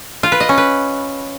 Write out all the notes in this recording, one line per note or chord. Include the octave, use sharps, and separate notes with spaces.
F4
B4
D#5
C#4
B4